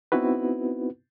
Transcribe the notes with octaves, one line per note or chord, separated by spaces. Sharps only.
B3 C4 D#4 E4 F#4 B4